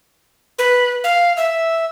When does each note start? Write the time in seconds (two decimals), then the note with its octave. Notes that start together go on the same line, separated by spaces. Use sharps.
0.59 B4
1.04 F5
1.37 E5